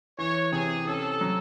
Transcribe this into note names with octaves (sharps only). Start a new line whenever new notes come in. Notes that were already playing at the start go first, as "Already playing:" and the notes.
E3 C#5
C3 G#4
C#4 A4
F#3